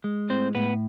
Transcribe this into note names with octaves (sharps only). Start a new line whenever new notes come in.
G#3
A2 C4 C5
A2 B3 B4